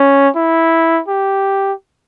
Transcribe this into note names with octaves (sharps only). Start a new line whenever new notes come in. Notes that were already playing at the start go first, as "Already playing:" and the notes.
Already playing: C#4
E4
G4